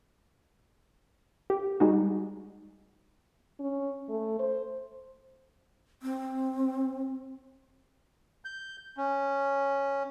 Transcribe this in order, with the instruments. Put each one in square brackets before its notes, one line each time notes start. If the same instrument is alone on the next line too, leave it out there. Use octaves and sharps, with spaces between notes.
[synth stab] G4
G3 G#3 D#4 F#4
[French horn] C#4
A3
C5
[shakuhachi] C4
[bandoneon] G6
C#4